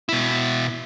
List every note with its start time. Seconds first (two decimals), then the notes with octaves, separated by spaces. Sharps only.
0.09 B2 E4